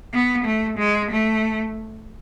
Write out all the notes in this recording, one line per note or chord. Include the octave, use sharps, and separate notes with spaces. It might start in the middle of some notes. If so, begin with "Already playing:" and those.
B3
A3
G#3
A3